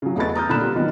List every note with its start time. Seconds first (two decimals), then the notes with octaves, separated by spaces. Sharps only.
0.02 C#3 F#3
0.16 E2 A3 B3 D#5 B5 A6
0.35 A#5 D#6 F6 G6
0.49 A#2 D3 B5 F#6 E7
0.62 G3 B3 F4
0.75 D#3 F#3 B3